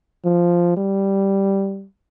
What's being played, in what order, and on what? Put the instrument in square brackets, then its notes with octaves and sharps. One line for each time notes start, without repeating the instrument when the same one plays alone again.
[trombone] F3
G3